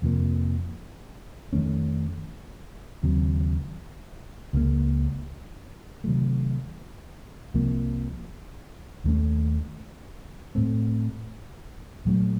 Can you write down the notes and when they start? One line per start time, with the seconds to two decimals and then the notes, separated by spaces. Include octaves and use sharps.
0.02 F2 C3 F3 A#3
1.53 F2 D#3 A3 C#4
3.03 D#2 C#3 F#3 C4
4.53 C#2 C#3 F3 A#3
6.04 C3 D#3 F#3 A3
7.54 C2 C3 F3 A#3
9.04 D#2 D#3 A3 C#4
10.55 A2 A3 C4
12.05 A#2 F#3 A3 C#4